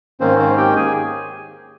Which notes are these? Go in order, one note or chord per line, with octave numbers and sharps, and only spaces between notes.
G#2 D#3 A#3 C4 C#4 C5
C4 C5
G4 G5
G#4 G#5